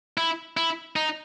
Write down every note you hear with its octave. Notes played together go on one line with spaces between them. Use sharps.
E4
E4
D#4